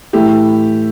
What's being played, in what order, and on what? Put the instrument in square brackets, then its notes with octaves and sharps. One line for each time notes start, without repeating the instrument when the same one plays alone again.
[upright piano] A2 E3 A3 E4 G4